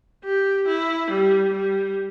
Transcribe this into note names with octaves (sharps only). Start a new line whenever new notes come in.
G4
E4
G3
G3